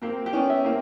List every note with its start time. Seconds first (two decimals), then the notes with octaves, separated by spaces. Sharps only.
0.02 A#3 C4 G4
0.26 G4
0.33 B3 C#4
0.50 E5
0.65 A#3 C4